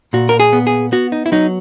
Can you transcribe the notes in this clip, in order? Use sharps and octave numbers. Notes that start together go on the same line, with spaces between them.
A#2 F#4
A#4
G#4
B3
G#4
B3 F#4
D#4
E4
F#3 D#4